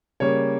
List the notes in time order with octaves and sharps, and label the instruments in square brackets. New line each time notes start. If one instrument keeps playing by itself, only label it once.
[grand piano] C#3 G3 A#3 C#5